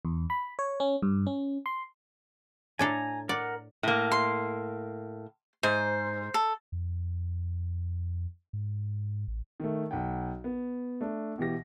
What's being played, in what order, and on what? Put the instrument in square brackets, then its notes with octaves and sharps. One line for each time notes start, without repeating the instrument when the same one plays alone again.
[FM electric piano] E2
B5
C#5
C#4
G2
C#4
C6
[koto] A2 D4 A4 [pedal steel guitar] G#5 A#5
[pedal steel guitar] A#4 F#5 [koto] D5
[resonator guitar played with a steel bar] A2 A#3
[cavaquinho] C6
[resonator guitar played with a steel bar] G#2 [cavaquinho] C5
[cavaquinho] A4
[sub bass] F2
G#2
A1
[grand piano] D#3 A3
B1 F#5 G5
B3
A3 D4
B2 E3 G4 A#6